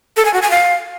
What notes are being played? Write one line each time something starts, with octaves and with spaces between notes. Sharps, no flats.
A4
G#5
F#4
G#5
F5